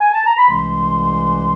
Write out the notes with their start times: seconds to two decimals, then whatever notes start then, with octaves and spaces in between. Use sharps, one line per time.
0.01 G#5
0.13 A5
0.26 A#5
0.38 B5
0.50 C2 C3 E3 G#3 C#4 C6